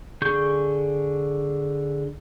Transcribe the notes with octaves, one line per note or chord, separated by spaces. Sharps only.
D3 G#4 C#6 G6